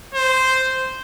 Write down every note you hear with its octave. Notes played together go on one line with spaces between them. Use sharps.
C5